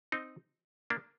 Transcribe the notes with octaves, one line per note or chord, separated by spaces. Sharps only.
C4 D#4
A#3 D4